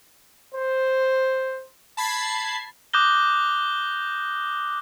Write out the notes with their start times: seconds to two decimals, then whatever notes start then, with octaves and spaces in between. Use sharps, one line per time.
0.55 C5
1.97 A5 B5 G#6 C7
2.93 D6 D#6 F#6 G6 A#6 G7